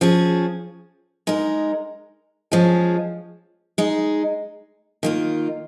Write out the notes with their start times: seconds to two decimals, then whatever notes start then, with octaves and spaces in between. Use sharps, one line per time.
0.01 F3 C#4 G#4
1.27 G#3 D#4 A#4
2.52 F3 G#3 C#4 G#4
3.78 G#3 D#4 G#4
5.03 D#3 A#3 F4